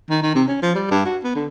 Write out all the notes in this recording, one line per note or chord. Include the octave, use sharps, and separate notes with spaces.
D#3
D#3
C3
C#4
F3
G3
G2
F#4
B3
D3